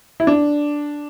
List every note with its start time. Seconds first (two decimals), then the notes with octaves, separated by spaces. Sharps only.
0.20 E4
0.27 D4